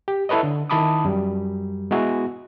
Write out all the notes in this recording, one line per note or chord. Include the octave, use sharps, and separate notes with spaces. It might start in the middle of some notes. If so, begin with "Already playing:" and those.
G4
E4 A4 B4 C#5 D#5
D3
D#3 E4 A5 B5 D6 D#6
F#2 G3
G#3 B3 E4 F#4